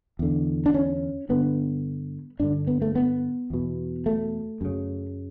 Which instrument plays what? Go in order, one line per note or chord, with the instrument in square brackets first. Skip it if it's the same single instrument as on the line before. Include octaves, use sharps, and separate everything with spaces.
[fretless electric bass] E2 D3
D4
C#4
G2 D3 B3
G2 D3 D4
B3
A3
B3
E2 B2
A3
F#2 C#3